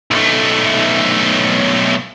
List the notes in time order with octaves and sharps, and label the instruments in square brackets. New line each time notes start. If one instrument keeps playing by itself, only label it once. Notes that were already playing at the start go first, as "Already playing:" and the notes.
[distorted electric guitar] B1 A3